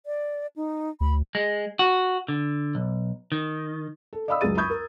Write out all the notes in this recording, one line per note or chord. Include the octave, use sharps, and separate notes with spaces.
D5
D#4
D2 B5
G#3
F#4
D3
B1
D#3
A4
D5 D#5 F5 B5 D#6 E6
C#2 F#2 G#3 G#4 A6 D#7
B5 C#6 D#6 G6 G#6
A#4